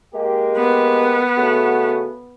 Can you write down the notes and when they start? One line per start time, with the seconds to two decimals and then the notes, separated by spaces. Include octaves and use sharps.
0.14 G#3 A#3 G4
0.57 B3
1.37 C#3 A3 F#4